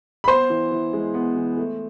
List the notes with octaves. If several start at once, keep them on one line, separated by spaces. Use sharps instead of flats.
B5
B3 C5 C6
E3
E3
G#3
B3
E3
A3